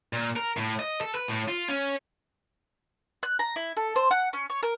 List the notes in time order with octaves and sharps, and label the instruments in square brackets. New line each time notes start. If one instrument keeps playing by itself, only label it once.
[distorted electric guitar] A#2
A#4
A2
D#5
A4
B4
A2
F4
C#4
[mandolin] F#6
A#5
E4
A4
C5
F#5
C#4
C#5
A#4